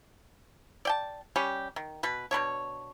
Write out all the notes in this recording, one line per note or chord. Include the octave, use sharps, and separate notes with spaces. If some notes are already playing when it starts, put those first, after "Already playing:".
D5 G5 A5
G3 C#4 G4
D#3
B2 B4
B2 B3 D4 C#5